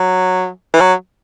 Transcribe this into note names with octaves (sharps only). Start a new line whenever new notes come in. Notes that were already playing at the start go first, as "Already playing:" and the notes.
Already playing: F#3
E3
F#3